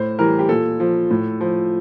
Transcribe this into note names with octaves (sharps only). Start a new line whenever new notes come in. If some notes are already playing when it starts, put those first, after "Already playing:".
Already playing: A2 C5
E3 G3 A#4
G4
A#2 A4
F3
A2
F3